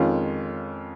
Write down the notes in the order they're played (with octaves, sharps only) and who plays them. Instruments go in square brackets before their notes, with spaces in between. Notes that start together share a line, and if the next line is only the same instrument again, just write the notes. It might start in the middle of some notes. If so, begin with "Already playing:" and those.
Already playing: [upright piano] F2 D#3 G#3 C#4 F4